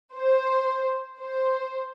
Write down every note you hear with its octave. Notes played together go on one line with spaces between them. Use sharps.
C5
C5